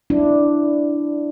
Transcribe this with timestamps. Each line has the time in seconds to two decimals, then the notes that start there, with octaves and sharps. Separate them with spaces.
0.10 D4 E4